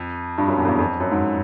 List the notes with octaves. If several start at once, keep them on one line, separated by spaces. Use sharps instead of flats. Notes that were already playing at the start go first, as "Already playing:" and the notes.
Already playing: F2
G2
F#2
E2
F2
E2
F2
F#2
G#2